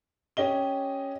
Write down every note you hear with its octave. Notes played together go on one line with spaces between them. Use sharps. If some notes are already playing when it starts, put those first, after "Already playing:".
C#4 G4 D#5 G7